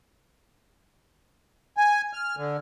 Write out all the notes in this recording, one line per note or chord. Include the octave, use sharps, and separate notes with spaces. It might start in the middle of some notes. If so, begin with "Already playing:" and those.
G#5
F6
D3